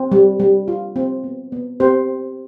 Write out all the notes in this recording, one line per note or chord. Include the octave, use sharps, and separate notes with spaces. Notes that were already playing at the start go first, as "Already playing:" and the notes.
Already playing: C4
G3
G3
F4
C4
B3
B3
C4 G4 C5